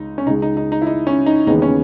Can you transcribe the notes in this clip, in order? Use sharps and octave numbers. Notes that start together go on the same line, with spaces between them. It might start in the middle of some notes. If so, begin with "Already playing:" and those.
Already playing: C#2 D#4
C#4
C#2 C#3 G#3 D#4
D#4
D#4
D#4
E4
D#4
C#4
D#4
D#2 C#3 E3 G#3 B3 D#4
C#4